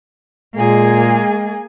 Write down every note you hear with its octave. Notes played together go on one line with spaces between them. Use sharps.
A#2 G#3 A#3 G#4 G#5